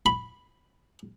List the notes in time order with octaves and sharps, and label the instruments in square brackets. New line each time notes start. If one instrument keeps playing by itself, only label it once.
[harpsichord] B5